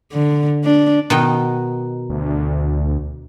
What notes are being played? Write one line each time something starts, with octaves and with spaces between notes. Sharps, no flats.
D3
D4
B2 D#3 G5
D2